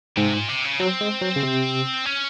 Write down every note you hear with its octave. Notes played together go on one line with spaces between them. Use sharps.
G#2 C3
A#2
C3
C#3
F#3 C4
G#3
F#3
C#3
C3
C#4